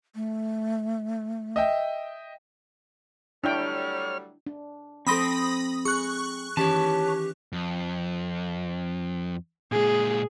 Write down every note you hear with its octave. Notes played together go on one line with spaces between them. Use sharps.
A3
D#5 E5 G5
F#3 G3 A3 D4 E4 C#5 G5 F6
D4
F3 C4 A4 B5 C6 D#6 A#6
G#4 C#6 F#6
D#3 E3 C#4 G4 C#5 A5
F2
A#2 G#3 G#4